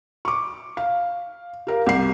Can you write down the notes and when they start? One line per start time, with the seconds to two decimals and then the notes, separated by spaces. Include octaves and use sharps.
0.25 C#6 D6
0.77 F5
1.67 G4 A#4 F5
1.86 C2 G4 C7